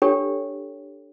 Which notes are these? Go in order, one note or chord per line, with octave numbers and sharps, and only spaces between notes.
D4 G4 A4 C#5 G5